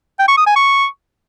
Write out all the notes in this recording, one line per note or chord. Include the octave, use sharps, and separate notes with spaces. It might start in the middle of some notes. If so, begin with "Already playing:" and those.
G5
C#6
D#6
G#5
C#6